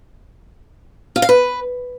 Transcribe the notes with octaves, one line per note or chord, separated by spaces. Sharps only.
F4
F5
B4